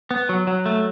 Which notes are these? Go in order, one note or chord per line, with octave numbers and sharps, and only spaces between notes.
B3
F#3
F#3
A3